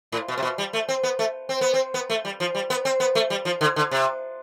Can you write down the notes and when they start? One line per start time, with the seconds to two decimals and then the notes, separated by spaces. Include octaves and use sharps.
0.12 A2
0.28 B2
0.38 C3
0.42 B2
0.58 G3
0.73 A3
0.89 C4
1.03 B3
1.19 A3
1.49 C4
1.61 B3
1.74 C4
1.94 B3
2.10 A3
2.25 G3
2.40 F3
2.55 G3
2.70 B3
2.85 C4
3.00 B3
3.15 A3
3.30 G3
3.45 F3
3.61 D3
3.76 D3
3.91 C3